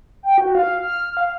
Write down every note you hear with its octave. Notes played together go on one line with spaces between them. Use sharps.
G5
F#4
F5
F6
F5